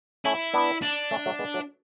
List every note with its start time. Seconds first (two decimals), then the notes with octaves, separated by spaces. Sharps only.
0.25 A3 C#4 E4
0.54 B3 D4
0.83 D4
1.11 A3 C#4
1.26 F#3 A3
1.39 G#3 B3
1.54 F#3 A3